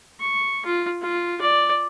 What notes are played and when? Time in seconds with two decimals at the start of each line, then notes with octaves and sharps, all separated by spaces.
0.20 C#6
0.65 F4
1.02 F4
1.41 D5